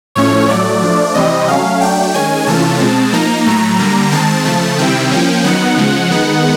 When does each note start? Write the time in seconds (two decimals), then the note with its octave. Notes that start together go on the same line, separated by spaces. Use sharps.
0.15 A2 F3 A3 C#4 C#5
0.49 A2 F#3 A3 D5
0.82 F3 A3 D4
1.14 C3 E3 G3 C4 D#5
1.48 F#3 A3 C#4 F5
1.81 F#3 A3 D4 G5
2.14 D#3 G#3 C#4 G#5
2.47 C3 E3 A3 C#4 F4 A5
2.80 B2 G#3 C4
3.13 F3 A#3 D#4 A#5
3.46 A2 F#3 A3 A#5
3.79 D3 G3 A#3
4.12 D#3 G#3 C4 A5
4.45 C#3 F3 A3 A5
4.78 C3 D#3 G3 C4 E4 G5
5.11 F3 A#3 C#4
5.44 D#3 F#3 B3 D#4 F#5
5.77 C#3 F3 G#3
6.10 D#3 G#3 B3 D#4